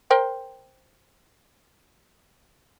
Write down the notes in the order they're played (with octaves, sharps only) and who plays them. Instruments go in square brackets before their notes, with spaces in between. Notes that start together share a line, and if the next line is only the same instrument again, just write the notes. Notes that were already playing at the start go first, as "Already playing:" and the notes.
[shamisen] A#4 C5 G5